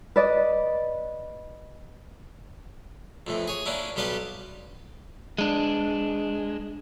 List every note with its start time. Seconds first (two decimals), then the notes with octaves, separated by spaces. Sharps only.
0.16 B4 D5 D#5
3.27 F2 A2 E3
3.48 G#4 C#5
3.66 A#3 C#4 D4 E4
3.96 B1 G3 G4 B4 F5 A5
5.38 G#3 D4